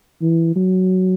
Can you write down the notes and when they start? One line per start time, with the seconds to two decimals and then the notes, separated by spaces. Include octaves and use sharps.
0.22 E3
0.56 F#3